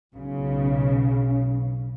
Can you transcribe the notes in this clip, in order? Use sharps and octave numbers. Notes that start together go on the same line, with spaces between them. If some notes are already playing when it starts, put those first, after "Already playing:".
B1 C#3